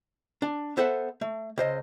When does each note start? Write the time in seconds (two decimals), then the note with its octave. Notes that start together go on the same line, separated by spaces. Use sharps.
0.42 D4
0.77 B3 A4 C5 E5 F#5
1.21 A3
1.58 C#2 C5 D#5